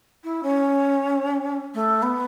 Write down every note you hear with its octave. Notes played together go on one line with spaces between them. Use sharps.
E4
C#4
A3
B3